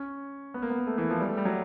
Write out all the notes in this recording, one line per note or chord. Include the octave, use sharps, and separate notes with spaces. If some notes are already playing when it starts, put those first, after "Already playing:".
Already playing: C#4
B3
A#3
B3
A#3
A3
E3
F3
G3
A3
G3
F#3